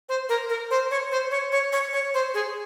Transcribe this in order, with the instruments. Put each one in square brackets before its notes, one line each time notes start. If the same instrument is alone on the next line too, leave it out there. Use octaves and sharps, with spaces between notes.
[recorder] C5
A#4
A#4
C5
C#5
C5
C#5
C#5
C#5
C#5
C5
G#4